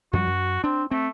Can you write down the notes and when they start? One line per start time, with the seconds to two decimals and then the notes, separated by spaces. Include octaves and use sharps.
0.13 F#2 F3 G3 F#4
0.27 F#2
0.64 C4 D4
0.91 A3 C4